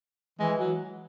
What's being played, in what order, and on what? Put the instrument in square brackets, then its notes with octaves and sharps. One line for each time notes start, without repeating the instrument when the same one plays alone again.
[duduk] E3 [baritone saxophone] G#3
[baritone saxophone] F#3